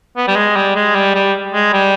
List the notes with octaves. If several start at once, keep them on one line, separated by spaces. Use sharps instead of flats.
B3
G3
G#3
G3
G#3
G3
G3
G#3
G3